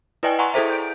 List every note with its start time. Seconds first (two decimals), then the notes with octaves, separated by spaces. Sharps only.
0.23 E4 B4 D5 D#5 G5 G#5
0.39 F#5 G#5 A#5 C6 C#6
0.54 E4 G#4 A4 C5 E5
0.70 G6 D7